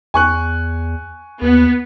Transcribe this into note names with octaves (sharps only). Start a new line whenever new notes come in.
E2 G#5 C#6 F#6
D#2 B3